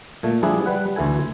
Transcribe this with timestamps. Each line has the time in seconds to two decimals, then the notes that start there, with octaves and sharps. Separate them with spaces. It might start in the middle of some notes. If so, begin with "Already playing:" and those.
0.23 A#2 A3
0.43 F3 G3 D4 E4 G#4
0.66 G3 B4 F#5
0.96 D2 E3 E4 A4 G#5